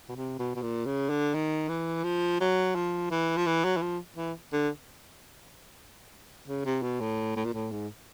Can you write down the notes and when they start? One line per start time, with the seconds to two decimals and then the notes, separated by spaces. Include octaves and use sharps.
0.09 B2
0.16 C3
0.39 B2
0.55 B2
0.62 A#2
0.86 C#3
1.10 D3
1.34 D#3
1.68 E3
2.04 F3
2.40 F#3
2.75 F3
3.11 E3
3.37 F3
3.46 E3
3.64 F#3
3.77 E3
3.82 F3
4.17 E3
4.53 D3
6.48 C#3
6.65 C3
6.82 B2
7.00 A2
7.36 A2
7.45 A#2
7.54 A2
7.72 G#2